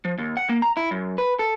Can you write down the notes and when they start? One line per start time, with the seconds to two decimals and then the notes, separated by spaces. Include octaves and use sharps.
0.05 F3
0.18 D#2
0.37 F#5
0.49 A#3
0.62 A#5
0.77 E4
0.91 F#2
1.18 B4
1.39 A4